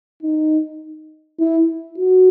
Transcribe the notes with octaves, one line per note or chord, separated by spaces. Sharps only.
D#4
E4
F#4